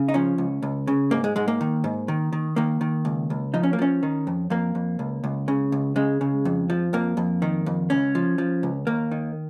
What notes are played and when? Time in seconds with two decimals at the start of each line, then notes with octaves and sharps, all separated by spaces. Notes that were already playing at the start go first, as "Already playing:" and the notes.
Already playing: C#3
0.08 D#4
0.14 F3 C#4
0.38 C#2
0.63 C#2
0.87 C#3
1.11 G#2 A#3
1.24 G#3
1.36 G#2 G#3
1.48 A#3
1.61 D#3
1.84 G#2
2.08 D#3
2.33 D#3
2.56 D#3 A#3
2.81 D#3
3.05 C#2
3.30 C#2
3.54 F3 D#4
3.63 C#4
3.73 A#3
3.79 F3 C#4
4.03 D#3
4.27 F2
4.50 F2 A#3
4.75 F2
4.99 C#2
5.24 C#2
5.48 C#3
5.72 C#2
5.96 C#3 G#3
6.21 C#3
6.45 F2
6.70 F3
6.93 F2 A#3
7.17 F2
7.42 D#3
7.66 F2
7.90 C#2 C#4
8.15 F3
8.38 F3
8.63 C#2
8.87 D#2 A#3
9.11 D#3